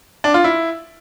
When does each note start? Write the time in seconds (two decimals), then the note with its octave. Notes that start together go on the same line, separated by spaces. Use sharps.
0.24 D4
0.34 F4
0.44 E4